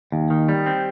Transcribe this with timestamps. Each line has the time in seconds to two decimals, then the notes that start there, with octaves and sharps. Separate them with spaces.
0.12 D#2
0.30 D#3
0.49 G3
0.66 C4